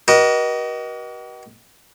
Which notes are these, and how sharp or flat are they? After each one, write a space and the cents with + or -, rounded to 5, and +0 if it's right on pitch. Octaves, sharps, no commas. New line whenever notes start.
F#4 +45 B4 -45 D#5 +0